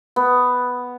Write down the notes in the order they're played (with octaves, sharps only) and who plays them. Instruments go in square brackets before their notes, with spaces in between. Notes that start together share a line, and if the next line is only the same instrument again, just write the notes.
[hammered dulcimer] B3